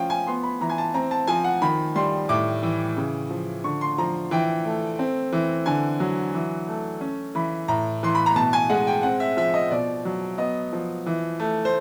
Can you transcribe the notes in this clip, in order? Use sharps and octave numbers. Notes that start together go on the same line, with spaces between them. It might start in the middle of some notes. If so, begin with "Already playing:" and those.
Already playing: F3 C#4 F5 G5
G#5
B3 C6
B5
E3 A#5
G#5
A5
C4 A#5
A5
F3 G#5
F#5
D#3 B5
G3 C6
A2 D6
E3
C#3
F3
D3 C#6
C6
F3 A#5
E3 G5
A3
C4
E3
D3 G#5
F#3
E3
A3
C#4
E3 B5
A2 A#5
E3 C6
B5
A#5
B2 A5
G#5
G#3 F#5
G5
C4 F#5
E5
F3 E5
D#5
B2 D5
F#3
B3 D#5
F3
E3
A3
C5